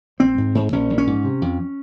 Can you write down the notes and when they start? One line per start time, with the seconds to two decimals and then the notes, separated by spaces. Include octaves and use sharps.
0.20 A#1 C4
0.38 G#2
0.55 G#2
0.72 A#1 C#4
0.90 A#1
0.98 C#4
1.07 G#2
1.24 C3
1.42 F2